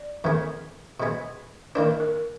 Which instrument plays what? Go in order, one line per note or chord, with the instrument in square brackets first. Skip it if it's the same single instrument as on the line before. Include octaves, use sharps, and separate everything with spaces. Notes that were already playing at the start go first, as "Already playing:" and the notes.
Already playing: [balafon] D5
[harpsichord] F2 D#3 G#3 B3 [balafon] B4
[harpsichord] B2 G#3 B3
[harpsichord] D#3 A#3 D4 [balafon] B4
[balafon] A#4